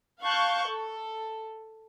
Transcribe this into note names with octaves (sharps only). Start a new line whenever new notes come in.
F5 A5 C#6 F#6 G6
A4